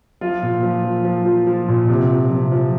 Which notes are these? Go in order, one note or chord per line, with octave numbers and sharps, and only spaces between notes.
F3 F4
A#2
F3
F3
F3
F3
F3
A#2
C3
F3
C3
F3